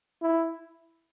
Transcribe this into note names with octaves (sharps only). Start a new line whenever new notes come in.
E4